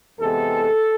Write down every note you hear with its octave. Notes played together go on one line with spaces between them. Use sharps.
E2 C3 E3 G#3 B3 A4